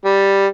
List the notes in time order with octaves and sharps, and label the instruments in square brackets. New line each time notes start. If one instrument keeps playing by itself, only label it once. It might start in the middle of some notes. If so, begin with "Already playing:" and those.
[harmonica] G3